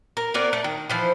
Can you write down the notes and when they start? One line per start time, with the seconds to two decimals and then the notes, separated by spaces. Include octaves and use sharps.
0.17 A#4
0.34 B3 C4 A#4 D5
0.53 A3
0.64 D#3
0.90 E3 F3 C5